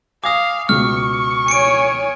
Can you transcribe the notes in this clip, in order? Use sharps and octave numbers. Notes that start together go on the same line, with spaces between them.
F5 G#5 D6 D#6 A#6
C#2 B2 C#6 F6
C#5 G#5 C#7 D7